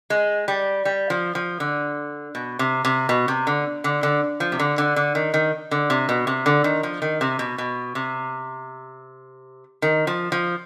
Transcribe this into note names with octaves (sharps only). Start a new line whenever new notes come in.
G#3
G3
G3
F3
F3
D3
B2
C3
C3
B2
C3
D3
D3
D3
F3
C3
D3
D3
D3
D#3
D#3
D3
C3
B2
C3
D3
D#3
F3
D#3
C3
B2
B2
C3
D#3
F3
F3